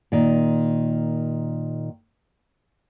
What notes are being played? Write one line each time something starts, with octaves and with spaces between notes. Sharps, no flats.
A#2 D#3